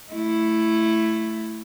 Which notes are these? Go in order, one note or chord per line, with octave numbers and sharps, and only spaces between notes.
A3 E4